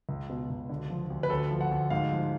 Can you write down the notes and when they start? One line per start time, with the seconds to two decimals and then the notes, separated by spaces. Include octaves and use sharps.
0.09 C#2
0.29 B2
0.50 C#2
0.69 D3
0.90 F3
1.10 D2
1.23 B4
1.30 D2 A4
1.51 F3
1.61 F#5
1.71 D2
1.90 G#2 F5
2.11 F3